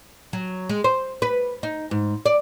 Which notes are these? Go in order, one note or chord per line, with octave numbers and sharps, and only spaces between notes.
F#3
G#3
C5
B4
D#4
G#2
D5